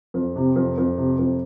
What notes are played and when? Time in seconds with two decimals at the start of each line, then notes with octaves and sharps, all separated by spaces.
0.14 F2
0.36 C3
0.56 F2
0.78 F2
0.97 C3
1.19 F2